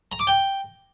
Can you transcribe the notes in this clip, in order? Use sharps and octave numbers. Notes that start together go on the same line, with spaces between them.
A#5
D6
G5